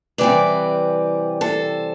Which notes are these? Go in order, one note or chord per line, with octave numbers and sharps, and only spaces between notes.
C3 E3 G3 C4 B4 D5
A4 C5